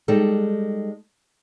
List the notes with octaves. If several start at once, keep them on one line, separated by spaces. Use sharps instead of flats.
G3 G#3 D#4 A4